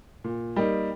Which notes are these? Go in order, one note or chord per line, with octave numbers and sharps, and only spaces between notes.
A#2
G3 A#3 D#4